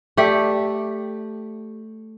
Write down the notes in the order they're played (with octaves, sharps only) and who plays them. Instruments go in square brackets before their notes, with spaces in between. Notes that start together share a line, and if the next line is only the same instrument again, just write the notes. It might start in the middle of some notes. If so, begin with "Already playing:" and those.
[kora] A3 G4 D5